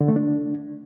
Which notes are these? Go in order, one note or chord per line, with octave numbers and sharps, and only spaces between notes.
D3
A3
D4